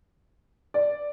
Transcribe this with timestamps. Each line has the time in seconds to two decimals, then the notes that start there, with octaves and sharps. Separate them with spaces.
0.74 D5